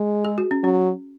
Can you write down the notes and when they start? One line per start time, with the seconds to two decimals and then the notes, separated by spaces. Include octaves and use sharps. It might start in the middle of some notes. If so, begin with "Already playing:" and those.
Already playing: G#3
0.25 G#4
0.38 F#4
0.51 C#4
0.64 F#3 C#4